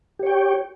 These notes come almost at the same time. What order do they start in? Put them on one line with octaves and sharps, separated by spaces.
G4 C#5 G5